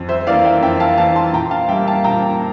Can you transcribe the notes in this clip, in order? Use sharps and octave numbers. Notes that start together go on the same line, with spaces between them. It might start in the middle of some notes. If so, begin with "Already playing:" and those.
Already playing: F2
C5 E5
E3 A#3 D5 F5
E5 G5
F2 E5 G5
F5 A5
E3 A#3 F5 A5
A5 C6
A#2 G5 A#5
F5 A5
G3 A#3 E5 G5
F5 A5
A#2 G5 A#5